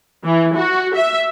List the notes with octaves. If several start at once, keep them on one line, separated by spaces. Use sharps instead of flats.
E3
F#4
E5